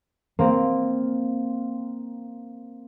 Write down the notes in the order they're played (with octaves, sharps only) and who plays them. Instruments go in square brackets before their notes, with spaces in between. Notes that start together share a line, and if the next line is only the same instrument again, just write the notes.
[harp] A#3 C4